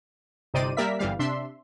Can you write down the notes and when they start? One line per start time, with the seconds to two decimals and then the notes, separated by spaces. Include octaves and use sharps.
0.54 G1 C3 D#4 C5 D5 D#7
0.77 G3 A#3 A#4 D5 E5 B6
0.99 G1 E3 G3 F5
1.19 C3 D4 E5 C6